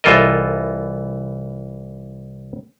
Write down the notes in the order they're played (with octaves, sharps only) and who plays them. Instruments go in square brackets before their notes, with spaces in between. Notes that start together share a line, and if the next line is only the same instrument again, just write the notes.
[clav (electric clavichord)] C2 E3 F4 A4 A#4 D#5